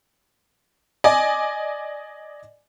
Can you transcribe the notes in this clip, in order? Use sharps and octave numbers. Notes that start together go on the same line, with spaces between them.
D5 D#5 G#5